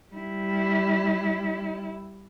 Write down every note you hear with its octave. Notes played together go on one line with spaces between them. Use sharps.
G3 E4